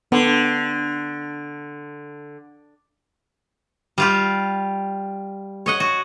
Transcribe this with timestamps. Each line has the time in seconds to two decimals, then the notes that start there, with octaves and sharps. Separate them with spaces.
0.12 D3 B3
3.98 G3 F4 G4
5.66 C#5 D#5 F#5
5.80 F#4